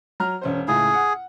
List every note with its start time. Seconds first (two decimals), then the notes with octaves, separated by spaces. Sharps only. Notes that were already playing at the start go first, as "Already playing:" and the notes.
0.20 F#3 A#5 F6
0.41 E1 C#4 C5
0.68 C#2 A2 G#4
0.93 F#5